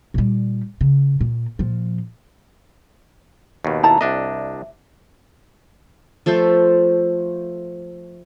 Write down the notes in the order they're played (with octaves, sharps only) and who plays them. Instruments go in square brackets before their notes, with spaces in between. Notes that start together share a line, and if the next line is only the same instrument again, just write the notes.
[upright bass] A#2 G3
C#3
A#2
A#2 F3
[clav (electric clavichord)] D#2 B2
[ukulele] E4 A5 A#5
[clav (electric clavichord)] C2 D4 D#5 [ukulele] E5
[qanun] F3 A3 A4 C5